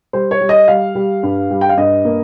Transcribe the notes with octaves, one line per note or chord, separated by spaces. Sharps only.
G3 C5
C#5
G3
D#5
G3 F5
G3
G2
G3
G5
F5
G2 D#5
A#3